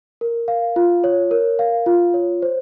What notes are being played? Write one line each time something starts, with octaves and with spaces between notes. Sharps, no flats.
A#4
F5
F4
C#5
A#4
F5
F4
C#5
C5